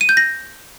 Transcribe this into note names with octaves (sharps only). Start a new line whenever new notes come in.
D#7
G6
A#6